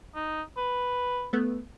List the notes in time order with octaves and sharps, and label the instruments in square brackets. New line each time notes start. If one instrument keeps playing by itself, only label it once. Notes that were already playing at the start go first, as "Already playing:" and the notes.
[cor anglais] D#4
B4
[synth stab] A3 B3